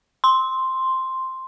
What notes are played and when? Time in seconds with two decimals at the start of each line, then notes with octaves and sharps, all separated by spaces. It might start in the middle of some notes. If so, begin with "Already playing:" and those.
0.24 C6